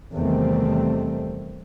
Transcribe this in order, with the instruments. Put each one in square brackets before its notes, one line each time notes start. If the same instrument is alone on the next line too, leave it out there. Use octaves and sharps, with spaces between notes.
[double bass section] E2 C3 D#3 G3 A3 C4